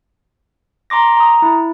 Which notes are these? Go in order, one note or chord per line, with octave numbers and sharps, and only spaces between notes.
A#5 C6 D6 A#6
A#5 D#6
E4